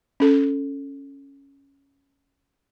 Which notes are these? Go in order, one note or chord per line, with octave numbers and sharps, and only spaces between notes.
C#4 A4